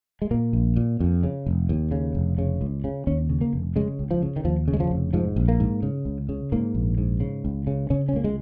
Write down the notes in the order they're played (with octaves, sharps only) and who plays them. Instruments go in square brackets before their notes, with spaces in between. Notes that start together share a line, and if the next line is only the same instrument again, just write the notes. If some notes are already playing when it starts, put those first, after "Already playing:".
[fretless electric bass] G#3
A#2 A#3
A#1
A#2
F2
C#3
F1
D#2
C#3
F1
C#3
C#2
C#3
D#2 C#4
C#3
A#3
F1
C#3 G#3
C#2
F3
C#3
D#3
D#2 F3
C#3
G#3
F3
F1
G#2 F3
A#1
A#3
G#2
C#3
C#2
C#3
G#2 A#3
A#1
G#2
C#3
C#2
C#3
C#3 C#4
C#4
C#2 A#3
G#3